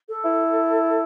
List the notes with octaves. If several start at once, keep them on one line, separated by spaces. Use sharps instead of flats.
A4
E4